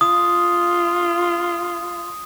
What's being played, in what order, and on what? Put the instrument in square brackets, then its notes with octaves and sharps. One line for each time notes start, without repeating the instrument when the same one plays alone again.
[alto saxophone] F4 [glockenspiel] D#6